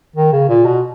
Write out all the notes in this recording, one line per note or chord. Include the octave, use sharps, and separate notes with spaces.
D#3
C#3
A#2
B2